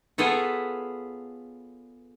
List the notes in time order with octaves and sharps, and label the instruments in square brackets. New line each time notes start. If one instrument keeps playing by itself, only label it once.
[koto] B3 F4 G#4 A4 B4 C#5